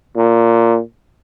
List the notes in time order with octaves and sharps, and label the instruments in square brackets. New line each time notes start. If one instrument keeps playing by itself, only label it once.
[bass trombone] A#2